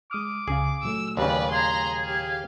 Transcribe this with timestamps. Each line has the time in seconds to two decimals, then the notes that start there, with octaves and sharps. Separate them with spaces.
0.11 G#3 D6 D#6 F6
0.48 C#2 C#3 G#4 F5
0.83 A#2 F#3 A3 E6
1.17 D#2 C#3 B4 D5
1.51 G#4 A#5 C6
2.04 G4 F5